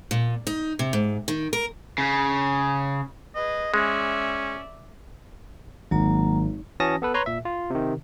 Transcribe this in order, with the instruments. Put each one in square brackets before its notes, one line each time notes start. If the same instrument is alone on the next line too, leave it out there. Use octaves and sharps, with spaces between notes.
[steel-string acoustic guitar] A#2
D#4
C3
G#2
D#3
A#4
[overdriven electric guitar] C#3
[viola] G#4 B4 [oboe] D#5
[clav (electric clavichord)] G#3 [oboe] C#4 [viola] D5 E5
[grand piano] G#1 [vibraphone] F#3 A#3 A#5
[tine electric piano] E3 C#4 F#4 A5 D#6 A#6
B3 A4 B4
B4 C#5 A#5 C6
A#2 E5
F4
C3 D#3